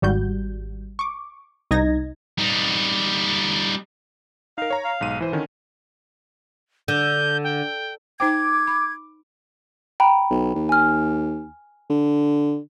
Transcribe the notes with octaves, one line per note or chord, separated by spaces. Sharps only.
G#1 G3 F#4 G6
C#6 D6
C2 D#4 D#5 G#6 A#6
G3 D#4
D#4 A#4 F5
C#5 A#5
F5
B1 G#2 D#7
E3 E4 C5
D3 D#3 C#4
D3 G6
G5
D#4 C5 G5 D6 G#6
B5
G5 A#5 B5
B1
D#2
G#5 F6
D3